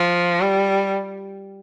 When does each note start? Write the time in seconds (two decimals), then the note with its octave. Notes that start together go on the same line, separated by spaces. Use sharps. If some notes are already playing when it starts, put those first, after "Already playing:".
Already playing: F3
0.41 G3